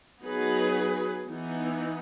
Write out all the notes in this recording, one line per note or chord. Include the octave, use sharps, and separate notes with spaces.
F#3 B3 D#4 G#4 B4
E3 B3 D#4